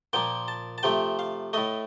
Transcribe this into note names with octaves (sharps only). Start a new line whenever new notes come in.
A#2 F3 A#3 G5
A5
A5
C3 F3 A3 G5
F5
A2 A3 D#5